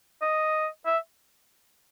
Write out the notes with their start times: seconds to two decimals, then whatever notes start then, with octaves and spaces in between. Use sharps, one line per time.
0.22 D#5
0.86 E5